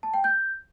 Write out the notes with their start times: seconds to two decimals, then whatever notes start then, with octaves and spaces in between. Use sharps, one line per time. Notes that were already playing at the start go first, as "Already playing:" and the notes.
0.03 A5
0.14 G5
0.24 G6